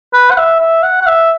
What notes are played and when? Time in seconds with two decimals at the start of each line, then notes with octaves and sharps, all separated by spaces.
0.13 B4
0.31 F#5
0.37 E5
0.60 E5
0.83 F#5
1.01 F#5
1.07 E5